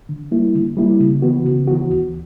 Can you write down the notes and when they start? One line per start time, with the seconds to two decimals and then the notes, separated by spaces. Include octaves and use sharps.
0.09 D3
0.31 G3 A#3 E4
0.54 D3
0.77 G3 A#3 E4
1.00 C#3
1.22 E3 B3 F#4
1.45 C#3
1.67 E3 B3 F#4
1.90 D2